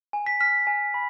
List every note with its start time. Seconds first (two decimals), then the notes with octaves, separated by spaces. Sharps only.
0.13 G#5
0.26 B6
0.40 F6 B6
0.67 G#5
0.94 B5